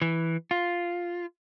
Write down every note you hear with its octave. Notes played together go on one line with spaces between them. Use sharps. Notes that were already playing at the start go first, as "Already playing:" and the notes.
E3
F4